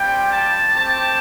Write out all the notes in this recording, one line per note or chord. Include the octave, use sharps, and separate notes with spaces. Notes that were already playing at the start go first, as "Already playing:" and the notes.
Already playing: G3 C4 F4 G5
A5
A3 C4 G4 A5